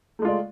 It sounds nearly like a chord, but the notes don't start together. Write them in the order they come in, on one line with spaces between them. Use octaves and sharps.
A3 G#3 F4 D5